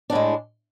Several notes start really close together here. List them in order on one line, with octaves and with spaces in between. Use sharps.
D4 A2 G#3